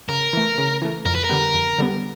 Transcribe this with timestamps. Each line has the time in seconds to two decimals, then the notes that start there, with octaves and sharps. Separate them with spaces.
0.09 C#3 A#4
0.33 E3 A3
0.58 C#3
0.82 E3 A3
1.06 F2 A#4
1.15 B4
1.24 A#4
1.29 D3 G3 B3
1.54 F2
1.78 D3 G3 B3